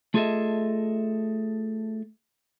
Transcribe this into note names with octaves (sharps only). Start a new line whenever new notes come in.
A3 F4 G#4 A4 D#5 E5